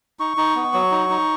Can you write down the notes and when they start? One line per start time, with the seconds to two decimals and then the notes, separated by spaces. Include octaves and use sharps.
0.19 D#4 C#6
0.37 D#4
0.55 B3
0.74 F#3
0.91 D#4
1.10 D#4